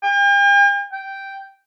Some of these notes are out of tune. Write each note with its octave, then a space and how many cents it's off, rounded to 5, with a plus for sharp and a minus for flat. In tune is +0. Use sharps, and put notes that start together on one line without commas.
G5 +45
G5 -5